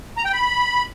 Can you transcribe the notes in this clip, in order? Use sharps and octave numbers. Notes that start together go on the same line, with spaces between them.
A#5
G5
B5